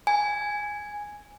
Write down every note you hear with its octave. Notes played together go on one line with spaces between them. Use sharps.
G#5